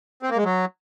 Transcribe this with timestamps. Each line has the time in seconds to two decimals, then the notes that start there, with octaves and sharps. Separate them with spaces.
0.23 C4
0.30 A#3
0.37 G#3
0.45 F#3